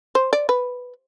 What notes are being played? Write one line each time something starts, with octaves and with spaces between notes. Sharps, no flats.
C5
D5
B4